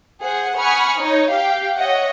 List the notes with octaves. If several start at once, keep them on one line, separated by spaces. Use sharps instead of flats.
G#4 C5 F#5
F#5 G#5 B5 C#6 D#6 F6
D#4 C#5
G4 F5 G5
C#5 D#5 E5 F#5